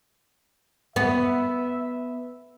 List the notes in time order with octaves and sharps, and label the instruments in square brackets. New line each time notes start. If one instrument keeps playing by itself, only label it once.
[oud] B3 [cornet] E5